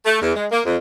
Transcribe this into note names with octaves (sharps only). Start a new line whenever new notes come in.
A3
E2
G#3
A#3
F2